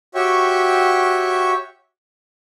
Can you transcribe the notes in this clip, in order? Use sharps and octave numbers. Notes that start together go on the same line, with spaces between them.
F#4 G4 C#5 E5 G5 C#6